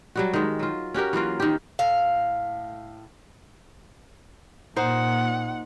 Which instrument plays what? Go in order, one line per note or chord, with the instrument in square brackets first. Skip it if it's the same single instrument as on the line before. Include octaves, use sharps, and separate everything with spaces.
[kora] F#3 G3 F#4
D#3 G#3
F#3 F4
C#4 F#4 G4 A#4
E3 F#3 A#3 F4
D#3 G4
[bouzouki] A2 F5
[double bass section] A#2 [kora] D#4 C5 [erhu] F#5